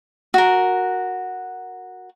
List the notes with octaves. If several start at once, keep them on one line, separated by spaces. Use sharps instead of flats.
F#4 A#4